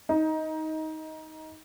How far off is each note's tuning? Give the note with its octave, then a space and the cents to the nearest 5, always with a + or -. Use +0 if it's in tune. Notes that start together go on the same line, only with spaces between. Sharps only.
D#4 +15